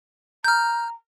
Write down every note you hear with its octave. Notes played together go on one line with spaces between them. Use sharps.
A#5 F6 G6